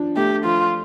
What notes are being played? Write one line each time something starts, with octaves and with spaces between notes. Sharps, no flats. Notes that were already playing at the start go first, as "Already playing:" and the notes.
Already playing: F3 D4
A3 G4
F3 F4